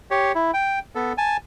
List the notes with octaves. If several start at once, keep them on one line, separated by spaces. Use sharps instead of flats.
G4 C#5
E4
G5
B3 A4
G#5 A5